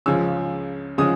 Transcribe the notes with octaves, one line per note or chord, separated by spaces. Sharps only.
C#2 C#3 F3 G#3 C#4 E6
C#3 F3 G#3 C#4 D#6